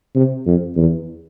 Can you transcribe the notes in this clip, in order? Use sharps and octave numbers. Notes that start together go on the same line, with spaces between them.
C3
F2
E2